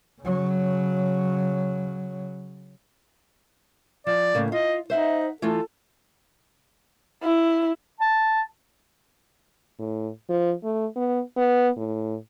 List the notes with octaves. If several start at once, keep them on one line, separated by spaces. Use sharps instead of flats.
C#3 F#3
F3 D5
A2 C#3 A#3
F4 D#5
D#4 C5 E5 F#5
E3 A3 F4 A4
E4
A5
A2
F3
A3
B3
B3
A2